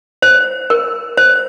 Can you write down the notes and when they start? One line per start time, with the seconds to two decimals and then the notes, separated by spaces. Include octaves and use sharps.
0.22 C5
0.70 A#4
1.17 C5